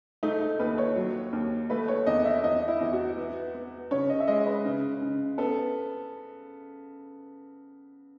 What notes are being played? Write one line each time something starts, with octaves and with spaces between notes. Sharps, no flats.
A3 D#4
D#4
D#2 B4
C#5
F#3
D#2
A3 B4
C#5
E2 D#5
E5
E2 D#5
E4
E2
F#4
B3
B3
C#3 C#5
D#5
E5
G#3 D#5
B4
C#3
C#3
B3 A4